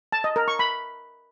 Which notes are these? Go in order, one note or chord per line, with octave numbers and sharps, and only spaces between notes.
A5
D#5
A#4
C#6
B5